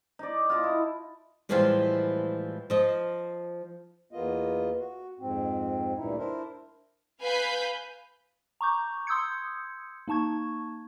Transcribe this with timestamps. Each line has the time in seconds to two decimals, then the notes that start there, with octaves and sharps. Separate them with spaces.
0.19 D#4 D5
0.50 F4 D#5 A5
0.63 E4
1.49 A2 E3 F3 G3 G#3 F4
2.70 F3 D#5
4.12 E2 A#3 B3 F4 D#5
4.79 F#4
5.19 F2 G#2 C4
5.97 D2 G2 A#2 D#4 E4
6.18 D4 E4 A#4 C5
7.21 B4 F5 G#5 B5 G6 B6
8.61 A#5 C#6 D6 G6
9.07 C6 D#6 E6 G6 G#6 C#7
10.08 A#3 D#4 A5 C#6 G#6